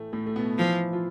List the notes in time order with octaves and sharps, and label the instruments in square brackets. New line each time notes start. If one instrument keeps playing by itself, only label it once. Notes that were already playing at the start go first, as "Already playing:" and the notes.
Already playing: [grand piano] A2 E3 A3
A2 A3
A3
B2 B3
[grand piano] E3 E4 [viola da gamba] F3
[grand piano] F3 F4